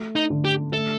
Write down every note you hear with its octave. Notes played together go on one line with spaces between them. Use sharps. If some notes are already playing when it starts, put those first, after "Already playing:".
Already playing: A3
D#4
D3
G4
A3 A4